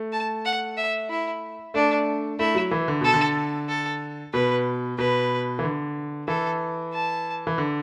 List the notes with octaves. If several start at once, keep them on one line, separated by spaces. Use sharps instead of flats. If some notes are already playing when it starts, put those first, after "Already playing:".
Already playing: A3
A5
F#5
E5
E4
A3 D4
A3 E4
F#3
E3
D3
B2 A4
D3
A4
B2 B4
B2 B4
E3
D3
E3 A4
A5
E3
D3